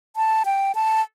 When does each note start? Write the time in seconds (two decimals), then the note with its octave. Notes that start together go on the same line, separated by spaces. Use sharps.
0.16 A5
0.45 G5
0.75 A5